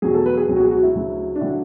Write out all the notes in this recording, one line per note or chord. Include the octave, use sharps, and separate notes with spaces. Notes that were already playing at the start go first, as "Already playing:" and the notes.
E2 B2 F#3 G#4
A4
B4
G#4
C#2 B2 F#3
F#4
G#4
F#4
E4
D2 C#3 F#3
D4
D3 F#3 E4